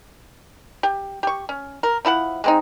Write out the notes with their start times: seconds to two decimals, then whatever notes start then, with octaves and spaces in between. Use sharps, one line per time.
0.83 G4
1.23 G4 C#6
1.49 C#4
1.83 A#4
2.05 F3 E4 A4 F#5
2.44 G#3 C4 D#4